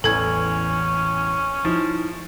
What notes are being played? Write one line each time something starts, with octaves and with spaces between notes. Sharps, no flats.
A1 E2 C#4 A4 G#6
F3 D#4 E4